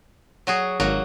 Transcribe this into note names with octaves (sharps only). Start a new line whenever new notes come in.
F#3 F#4 G#4
G#1 F#3 A#3 F#4